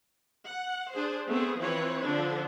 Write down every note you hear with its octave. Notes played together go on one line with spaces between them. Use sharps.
F#5
D4 G#4 C5
A3 B3 C4 G#4
E3 F3 C4 B4 C#5
D3 F3 D4